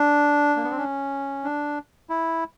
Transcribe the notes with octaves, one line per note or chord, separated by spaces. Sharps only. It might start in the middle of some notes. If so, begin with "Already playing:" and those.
Already playing: D4
A#3
B3
C4
C#4
D4
E4